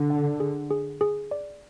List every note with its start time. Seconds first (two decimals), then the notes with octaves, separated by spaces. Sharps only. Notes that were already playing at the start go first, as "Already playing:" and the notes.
Already playing: D3
0.10 F#5
0.40 G#4
0.70 G#4
1.01 G#4
1.31 D5